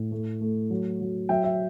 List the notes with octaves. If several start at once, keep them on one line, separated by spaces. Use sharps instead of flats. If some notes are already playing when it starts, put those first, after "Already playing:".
Already playing: A2
A3
A3
F#3
F#3
F#3 E5 G5
E5